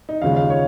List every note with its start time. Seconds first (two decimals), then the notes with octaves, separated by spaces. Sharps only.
0.09 D#4
0.22 D#2 C#3 F3 G#3 F5
0.37 F5
0.50 C#5